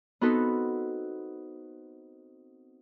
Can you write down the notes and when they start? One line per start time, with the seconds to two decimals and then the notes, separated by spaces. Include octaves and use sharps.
0.21 B3 C4 D#4 F#4 A4 B4